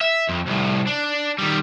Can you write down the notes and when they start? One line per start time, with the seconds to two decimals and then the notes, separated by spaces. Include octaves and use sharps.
0.01 E5
0.29 F2
0.46 C2 A2
0.87 D4
1.38 D#3 G3